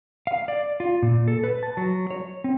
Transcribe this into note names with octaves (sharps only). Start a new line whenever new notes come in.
F5
D5
F4
A#2
A4
B4
A5
F#3
C#5
C4